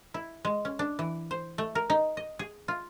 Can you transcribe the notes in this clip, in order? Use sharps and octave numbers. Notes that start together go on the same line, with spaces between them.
E4
G#3
C#4
D4
E3
C5
A3
A#4
D#4
D#5
G#4
F4